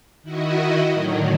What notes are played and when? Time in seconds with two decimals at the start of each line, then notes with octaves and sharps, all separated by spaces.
0.23 D#3 E4 F#4 D#5
0.93 A2 D3 D#3 F#3